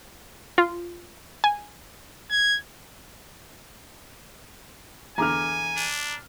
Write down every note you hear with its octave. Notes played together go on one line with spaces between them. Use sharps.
F4
G#5
G#6
E2 D3 G#5 A#5 D6 F6
D4